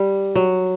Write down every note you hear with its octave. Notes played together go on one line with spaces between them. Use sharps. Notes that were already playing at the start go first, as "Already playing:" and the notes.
Already playing: G3
F#3